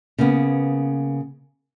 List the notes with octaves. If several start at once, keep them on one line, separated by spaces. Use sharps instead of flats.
C#3 A#3 B3